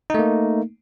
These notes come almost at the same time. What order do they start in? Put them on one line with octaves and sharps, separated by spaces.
D#4 A3 A#3